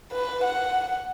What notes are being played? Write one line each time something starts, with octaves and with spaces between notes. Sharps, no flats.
B4
F#5